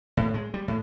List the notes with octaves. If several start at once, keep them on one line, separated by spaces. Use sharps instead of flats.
A2
G#3
G3
A2